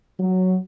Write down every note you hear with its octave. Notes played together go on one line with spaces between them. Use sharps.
F#3